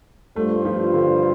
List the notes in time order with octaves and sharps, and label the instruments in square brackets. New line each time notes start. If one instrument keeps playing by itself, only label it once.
[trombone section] G2 G3 F4 C5 [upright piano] A3
[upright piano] F3
D3